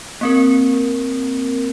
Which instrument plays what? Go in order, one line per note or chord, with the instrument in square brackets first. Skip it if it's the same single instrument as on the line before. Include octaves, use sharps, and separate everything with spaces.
[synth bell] A#3 C4 A#4